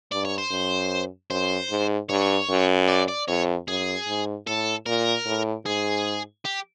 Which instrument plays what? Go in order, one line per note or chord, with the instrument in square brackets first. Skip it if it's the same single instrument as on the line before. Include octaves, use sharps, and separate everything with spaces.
[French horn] G2 [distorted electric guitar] D5
[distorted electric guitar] C#5
C5
[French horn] F#2
[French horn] F#2 [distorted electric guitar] C5
[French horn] G#2
[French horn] G2 [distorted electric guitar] C#5
[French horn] F#2
[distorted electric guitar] D5
D5
[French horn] F2 [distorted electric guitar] C#5
[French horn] F#2 [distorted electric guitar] G#4
[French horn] G#2
[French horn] A2 [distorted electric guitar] A4
[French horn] A#2 [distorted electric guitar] A#4
[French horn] A2
[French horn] G#2 [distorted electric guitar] G#4
[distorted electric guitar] G4